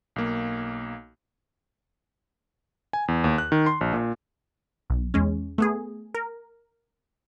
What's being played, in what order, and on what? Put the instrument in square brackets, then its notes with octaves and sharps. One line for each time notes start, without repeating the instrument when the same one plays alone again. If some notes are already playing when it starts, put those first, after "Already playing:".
[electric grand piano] B1 A#3
G#5
E2
D#2
F#6
D#3
C6
A#1
A#2
[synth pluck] B1
E2 G#3 C#4
A3 B3 G#4
A#4